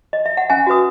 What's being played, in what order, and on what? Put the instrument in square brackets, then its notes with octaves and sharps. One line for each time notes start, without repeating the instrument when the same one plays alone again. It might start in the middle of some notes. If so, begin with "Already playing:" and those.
[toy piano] D#5
E5
F#5
C#4 E5 G#5
F#4 B4 D#6